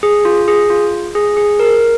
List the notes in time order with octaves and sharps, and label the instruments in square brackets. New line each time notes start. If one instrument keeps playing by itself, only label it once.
[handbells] G#4
F4
G#4
F4
G#4
G#4
A#4